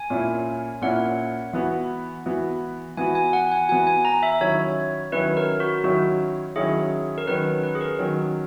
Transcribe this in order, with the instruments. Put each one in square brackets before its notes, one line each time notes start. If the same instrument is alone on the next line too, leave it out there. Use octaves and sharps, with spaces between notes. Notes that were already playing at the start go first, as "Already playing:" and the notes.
Already playing: [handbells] G#5
[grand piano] A#2 A#3 C#4 E4
[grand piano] A#2 A#3 C#4 E4 [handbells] F#5
[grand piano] E3 B3 F#4
E3 B3 F#4
[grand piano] E3 B3 F#4 [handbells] G#5
[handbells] G#5
F#5
G#5
[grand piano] E3 B3 F#4 [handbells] G#5
[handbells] G#5
A#5
E5
[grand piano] D#3 F#3 C#4 E4 [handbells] C#5
[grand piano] D#3 F#3 C#4 E4 [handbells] B4
[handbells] A#4
F#4
[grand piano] D#3 F#3 C#4 E4 [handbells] F#4
[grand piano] D#3 F#3 C#4 E4 [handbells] G#4
[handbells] A#4
[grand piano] D#3 F#3 C#4 [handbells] B4
[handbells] B4
G#4
A#4
[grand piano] D#3 F#3 C#4